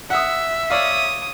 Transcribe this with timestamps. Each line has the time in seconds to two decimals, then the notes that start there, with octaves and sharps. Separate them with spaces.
0.10 E5 F#5 D#6
0.70 C#5 D5 F5 D#6